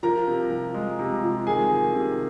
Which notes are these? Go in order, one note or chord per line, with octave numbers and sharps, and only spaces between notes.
F3 A#4 A#5
C3
F3
G#3
C3
F3
D#3 G#4 G#5
D#3
C3